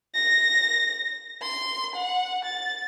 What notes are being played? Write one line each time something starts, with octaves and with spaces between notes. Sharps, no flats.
A#6
C6
F#5
A6